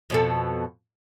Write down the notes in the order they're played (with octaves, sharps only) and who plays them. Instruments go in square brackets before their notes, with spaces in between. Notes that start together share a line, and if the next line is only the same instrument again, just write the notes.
[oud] F2 B2 A4